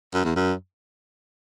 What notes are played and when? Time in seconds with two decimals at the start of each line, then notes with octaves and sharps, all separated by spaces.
0.14 F#2
0.24 E2
0.36 F#2